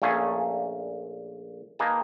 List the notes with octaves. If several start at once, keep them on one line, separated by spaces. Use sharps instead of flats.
A#1 A#2 A3 C#4 G#4
A#3 D#4 G#4 B4 A5